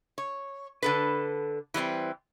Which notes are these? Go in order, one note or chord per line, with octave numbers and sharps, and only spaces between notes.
C#5
D3 A4 B4
E3 G3 A3 C4